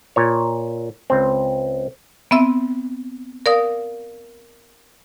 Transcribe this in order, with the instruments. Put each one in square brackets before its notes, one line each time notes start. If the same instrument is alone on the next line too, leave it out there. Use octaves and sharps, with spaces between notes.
[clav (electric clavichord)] A#2 C#5
C#2 C4
[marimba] B3 C4 E5 E6
A#4 D5 F5 D#6